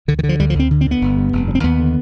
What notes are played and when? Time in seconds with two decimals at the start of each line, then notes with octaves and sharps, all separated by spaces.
0.08 D2 D3
0.19 D#3
0.23 D3
0.29 F3
0.39 D2 G3
0.50 F3
0.55 D2 C4
0.71 D3
0.81 C4
0.86 D3
0.91 B3
1.02 G1
1.17 G2
1.33 F1
1.48 D3
1.55 C4
1.64 D#2 B3
1.79 D3